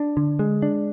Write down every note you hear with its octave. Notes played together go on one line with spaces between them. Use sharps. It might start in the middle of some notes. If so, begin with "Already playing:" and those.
Already playing: D4
D3
G#3
D4